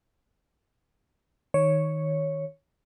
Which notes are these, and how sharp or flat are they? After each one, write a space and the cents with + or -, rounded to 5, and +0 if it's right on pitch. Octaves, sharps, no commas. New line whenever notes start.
D#3 +10 C#5 +0